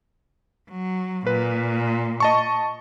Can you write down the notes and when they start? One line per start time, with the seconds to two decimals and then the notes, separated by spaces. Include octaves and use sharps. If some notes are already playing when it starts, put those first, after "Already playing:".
0.70 F#3
1.27 A#2 B4
2.20 D#5 A5 C#6